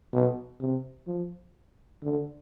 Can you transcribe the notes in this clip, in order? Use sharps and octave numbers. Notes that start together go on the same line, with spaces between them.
B2
C3
F3
D3